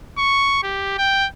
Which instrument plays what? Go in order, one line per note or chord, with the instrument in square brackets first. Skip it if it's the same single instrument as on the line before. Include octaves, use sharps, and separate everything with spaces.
[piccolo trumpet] C#6
G4
G5